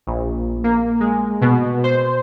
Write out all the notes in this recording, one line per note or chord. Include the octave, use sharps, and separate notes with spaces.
A#1
A#3
G#3
B2
C5